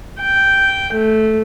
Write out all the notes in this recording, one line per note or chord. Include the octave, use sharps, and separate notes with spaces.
G5
A3